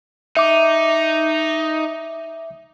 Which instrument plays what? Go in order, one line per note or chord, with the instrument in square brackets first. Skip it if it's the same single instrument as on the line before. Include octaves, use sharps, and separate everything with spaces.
[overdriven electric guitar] D#4 [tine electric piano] E5 D6